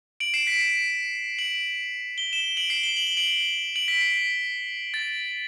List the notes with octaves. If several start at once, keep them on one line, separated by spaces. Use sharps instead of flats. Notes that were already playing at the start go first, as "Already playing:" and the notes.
D7 F#7
C7 E7
B6 D7
C7 E7
D7 F#7
G7
E7 G7
D7 F#7
C7 E7
E7 G7
F#7
G7
D7 F#7
D7 F#7
B6 D7
C7
B6
A6